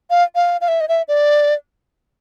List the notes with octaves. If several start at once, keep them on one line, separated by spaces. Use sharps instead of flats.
F5
F5
F5
E5
D#5
E5
D5